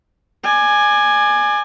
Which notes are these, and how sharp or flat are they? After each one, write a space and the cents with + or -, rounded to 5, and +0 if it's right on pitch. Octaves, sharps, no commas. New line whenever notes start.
D5 +30 G#5 +0